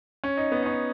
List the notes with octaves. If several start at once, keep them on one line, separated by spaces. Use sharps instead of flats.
C#4
D#4
B3
D#4
C#4